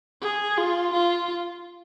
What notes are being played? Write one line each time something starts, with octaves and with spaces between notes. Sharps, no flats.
G#4
F4
F4